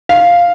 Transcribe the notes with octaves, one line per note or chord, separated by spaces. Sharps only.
F5